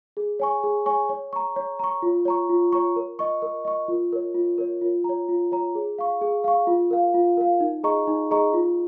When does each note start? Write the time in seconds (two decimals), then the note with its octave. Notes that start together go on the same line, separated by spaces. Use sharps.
0.17 G#4
0.39 C#5 G#5 C#6
0.63 G#4
0.86 C#5 G#5 C#6
1.09 C#5
1.33 A#5 C#6
1.56 C#5
1.79 A#5 C#6
2.02 F4
2.25 C#5 A#5 C#6
2.49 F4
2.72 C#5 A#5 C#6
2.96 A#4
3.19 D#5 C#6
3.42 A#4
3.65 D#5 C#6
3.88 F4
4.13 A#4 C#5
4.35 F4
4.58 A#4 C#5
4.81 F4
5.04 C#5 A#5
5.29 F4
5.52 C#5 A#5
5.75 G#4
5.99 F5 C#6
6.21 G#4
6.44 F5 C#6
6.67 F4
6.91 A#4 F5
7.14 F4
7.37 A#4 F5
7.60 D#4
7.84 G#4 D#5 A#5 C#6
8.07 D#4
8.31 G#4 D#5 A#5 C#6
8.53 F4